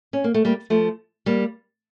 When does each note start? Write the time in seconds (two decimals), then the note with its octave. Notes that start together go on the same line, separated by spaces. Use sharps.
0.13 C#4
0.24 A#3
0.34 A3
0.45 G3 A#3
0.70 F3 A3
1.26 G3 A#3